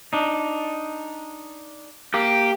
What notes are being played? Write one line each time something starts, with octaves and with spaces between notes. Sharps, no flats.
D4 D#4
A#3 G4